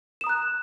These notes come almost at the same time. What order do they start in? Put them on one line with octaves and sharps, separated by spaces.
E7 D#6 A#5 F#6